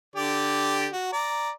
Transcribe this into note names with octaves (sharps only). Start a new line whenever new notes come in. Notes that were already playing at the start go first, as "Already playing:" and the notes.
D3 G4 D5
F#4
D5 A#5